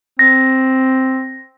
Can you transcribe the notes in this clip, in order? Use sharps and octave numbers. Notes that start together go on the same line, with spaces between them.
C4 A#6